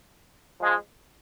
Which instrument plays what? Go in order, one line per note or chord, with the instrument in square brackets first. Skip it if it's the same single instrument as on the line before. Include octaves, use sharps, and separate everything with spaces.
[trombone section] F3 G#3